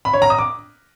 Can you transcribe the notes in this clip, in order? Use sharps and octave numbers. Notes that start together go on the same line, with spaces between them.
B5
C#5
A#5
D#6
D6